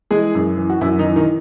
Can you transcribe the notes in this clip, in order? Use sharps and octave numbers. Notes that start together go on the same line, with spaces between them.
E3 G#3 G#4
F#2
E3
F#4
F#2 E3 E4
D#3 D#4
E3
D#3 D#4